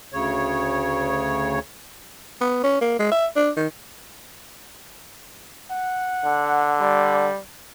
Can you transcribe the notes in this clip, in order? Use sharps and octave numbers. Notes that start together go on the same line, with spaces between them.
D2 C#3 C#5
B3
C#4
A#3
G#3
E5
D4
D#3
F#5
D3
G3